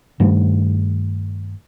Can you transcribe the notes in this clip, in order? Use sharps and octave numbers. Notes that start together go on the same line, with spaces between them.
G2 D#3 G3 A3